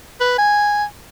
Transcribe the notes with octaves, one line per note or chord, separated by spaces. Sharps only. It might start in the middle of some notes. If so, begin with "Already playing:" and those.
B4
G#5